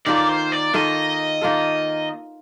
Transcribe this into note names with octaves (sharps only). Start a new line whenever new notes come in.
D#3 A#3 F4 A4 D5
C5
D5
D#3 A#3 F4 A4 D#5
D#3 A#3 F4 A4